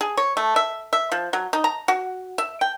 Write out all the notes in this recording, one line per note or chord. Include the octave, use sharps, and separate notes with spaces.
G#4
C#5
A3
E5
E5
F3
F#3
D#4
A#5
F#4
E5
G5